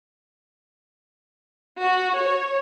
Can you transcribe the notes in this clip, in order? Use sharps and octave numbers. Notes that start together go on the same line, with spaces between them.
F#4
C#5